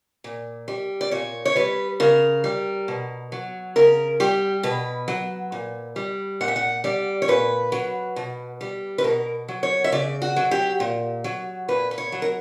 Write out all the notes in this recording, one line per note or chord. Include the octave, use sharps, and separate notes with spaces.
A#2
G3
D5
A#2 C#5
C#5
G3 B4
C#3 A#4
G3
B2
F#3
C#3 A#4
G3 G4
B2 B4
F#3
A#2
G3
A#2 F#5
E5
F#5
G3 D5
C#5
A#2 B4
F#3
B2
G3
B4
B2 A#4
F#3
C#5
E5
C#3 D5
F#4
F#3
G4
A#2
F#3
A#2 B4
B4
C#5
F#3
A#4